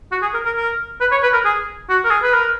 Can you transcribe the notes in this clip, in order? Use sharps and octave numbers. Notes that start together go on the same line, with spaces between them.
F#4
G#4
A#4
A#4
A#4
B4
C#5
B4
A#4
G#4
F#4
A#4
G#4
B4
A#4